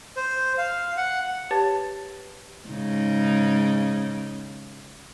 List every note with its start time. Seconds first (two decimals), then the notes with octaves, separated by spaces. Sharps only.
0.17 C5
0.58 F5
0.97 F#5
1.51 G4 B4 C#5 A5 A6
2.69 G#2 C#3 D#4